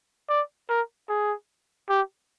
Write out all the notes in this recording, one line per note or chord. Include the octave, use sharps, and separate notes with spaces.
D5
A#4
G#4
G4